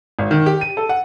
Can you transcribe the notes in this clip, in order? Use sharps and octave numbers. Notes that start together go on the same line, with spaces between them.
G#1
D#3
G4
D#7
A4
F#5